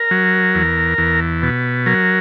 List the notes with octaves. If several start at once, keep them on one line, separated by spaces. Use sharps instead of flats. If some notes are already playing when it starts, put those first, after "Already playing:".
Already playing: A#4
F#3
E2
E2
B2
F#3 A#4